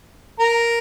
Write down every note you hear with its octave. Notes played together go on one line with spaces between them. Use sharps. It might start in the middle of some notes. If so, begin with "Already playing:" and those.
A#4